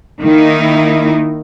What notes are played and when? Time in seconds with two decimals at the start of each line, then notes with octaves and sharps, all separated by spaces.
0.20 D#3 A#3 D#4 E4